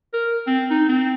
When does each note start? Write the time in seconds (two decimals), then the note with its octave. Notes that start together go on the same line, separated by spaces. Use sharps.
0.13 A#4
0.47 C4
0.70 D#4
0.89 C4